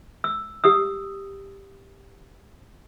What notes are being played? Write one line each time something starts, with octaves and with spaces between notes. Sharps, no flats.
E6
G4 D#6 E6